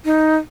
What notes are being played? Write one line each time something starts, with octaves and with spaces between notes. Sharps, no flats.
D#4